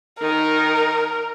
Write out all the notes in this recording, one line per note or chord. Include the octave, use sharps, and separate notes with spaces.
D#3 D#4 A#4